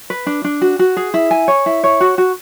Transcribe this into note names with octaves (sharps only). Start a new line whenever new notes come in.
B4
D4
D4
F#4
F#4
G#4
E4
G#5
C#5
E4
C#5
F#4
F#4